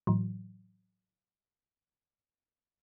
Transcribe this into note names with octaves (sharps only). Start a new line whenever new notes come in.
A2 E3 F#3